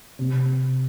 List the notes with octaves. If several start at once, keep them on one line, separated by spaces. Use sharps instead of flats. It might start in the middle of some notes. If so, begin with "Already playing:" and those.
C3